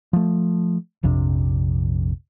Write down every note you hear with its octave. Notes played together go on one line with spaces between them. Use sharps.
F3 A3
A#1 F2 C3 D4